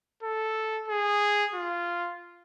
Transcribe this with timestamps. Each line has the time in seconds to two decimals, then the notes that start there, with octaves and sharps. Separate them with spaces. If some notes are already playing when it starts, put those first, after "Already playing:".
0.23 A4
0.88 G#4
1.54 F4